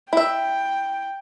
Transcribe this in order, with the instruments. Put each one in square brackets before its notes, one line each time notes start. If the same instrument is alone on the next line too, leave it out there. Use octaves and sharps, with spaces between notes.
[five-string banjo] E4 E5 [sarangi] G5